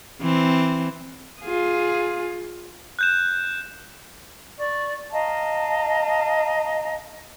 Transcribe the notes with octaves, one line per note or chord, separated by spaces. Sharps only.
E3 C4
F4 G#4
F#6 G6 E7
D5 C#6
D#5 F5 A5 A#5